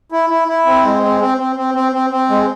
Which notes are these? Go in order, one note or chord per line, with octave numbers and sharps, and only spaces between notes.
E4
E4
E4
C4
G#3
C4
C4
C4
C4
C4
C4
C4
G#3